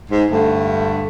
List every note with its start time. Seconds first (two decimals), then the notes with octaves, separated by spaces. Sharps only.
0.10 G#2
0.31 G2 D3 A3